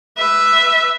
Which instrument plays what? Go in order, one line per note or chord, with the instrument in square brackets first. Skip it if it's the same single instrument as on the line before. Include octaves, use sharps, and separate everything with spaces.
[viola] B4 E5